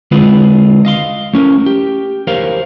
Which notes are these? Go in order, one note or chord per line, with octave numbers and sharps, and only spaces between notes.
D3 G#3 C4 F4 G#4 B4
D#5 F5 C6
A3 C#4 A#4
G4
G4 A#4 C5 C#5 F5